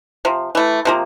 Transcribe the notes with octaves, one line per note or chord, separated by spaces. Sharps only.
C3 F3
E3 A3
C3 F3 A#3